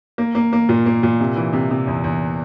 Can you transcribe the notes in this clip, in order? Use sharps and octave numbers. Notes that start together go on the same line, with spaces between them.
A#3
A#3
A#3
A#2
A#3
A#2
C3
E3
C3
C3
E2
E2